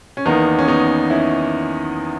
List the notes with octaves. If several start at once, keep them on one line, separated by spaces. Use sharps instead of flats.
C#4
E2 D#3 A#3 B3 D#4
C#4
B3 D#4
C#4 E4